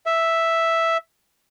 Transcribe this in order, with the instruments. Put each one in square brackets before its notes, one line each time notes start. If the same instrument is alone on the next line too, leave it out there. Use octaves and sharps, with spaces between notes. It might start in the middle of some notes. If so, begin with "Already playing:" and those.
[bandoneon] E5